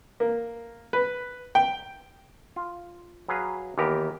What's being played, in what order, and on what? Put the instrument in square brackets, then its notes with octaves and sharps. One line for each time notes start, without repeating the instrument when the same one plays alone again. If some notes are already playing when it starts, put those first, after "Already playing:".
[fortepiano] A#3
B4
G5
[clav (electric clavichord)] F4
F#3 G#4 B4 F5
D#2 E3 B3 G4 A#4